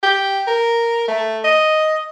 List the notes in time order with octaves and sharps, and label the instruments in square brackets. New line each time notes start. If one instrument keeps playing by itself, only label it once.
[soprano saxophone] G4
A#4
A3
D#5